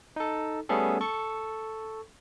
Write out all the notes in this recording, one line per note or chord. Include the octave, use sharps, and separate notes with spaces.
D#4 A4
G3 A3 B3 C#4 G#4 A4
A4 C#6